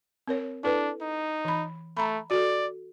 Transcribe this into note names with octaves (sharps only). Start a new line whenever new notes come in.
C4 A#4 C#5
D4 E4 A4 B4
D#4
E3 B5
A3 A#5 B5
F#4 A4 D5